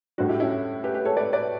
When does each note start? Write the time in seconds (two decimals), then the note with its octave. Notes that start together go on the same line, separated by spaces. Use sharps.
0.18 A2 G3 D4 F#4
0.29 E4 G4
0.40 C#4 E4
0.84 G4 B4
0.94 G4 B4
1.05 A4 C#5
1.17 B4 D5
1.33 B4 D5